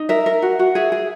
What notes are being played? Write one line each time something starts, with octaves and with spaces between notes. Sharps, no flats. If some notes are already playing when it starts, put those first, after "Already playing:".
Already playing: D#4
A#4 E5
A#4
F#4
F#4
G#4 E5
G#4